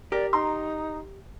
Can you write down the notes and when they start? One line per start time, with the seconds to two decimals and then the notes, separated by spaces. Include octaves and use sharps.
0.12 G4 A#4 D5
0.33 D#4 A#5 C6